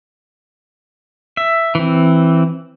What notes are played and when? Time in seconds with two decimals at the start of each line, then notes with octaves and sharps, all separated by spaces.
1.37 E5
1.75 E3 C4